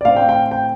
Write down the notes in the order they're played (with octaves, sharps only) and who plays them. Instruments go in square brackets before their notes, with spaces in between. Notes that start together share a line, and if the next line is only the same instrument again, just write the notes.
[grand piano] D5
A2 A3 C4 F5
G5
G5
G5